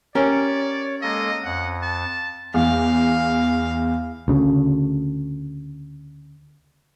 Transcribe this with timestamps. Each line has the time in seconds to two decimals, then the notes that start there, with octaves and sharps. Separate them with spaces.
0.15 C#4 G4 A#4 C#5 D5
1.02 G#3 A#3 A4 D#5
1.44 F2 F#5
1.82 A5
2.54 E2 F5
4.28 D2 C#3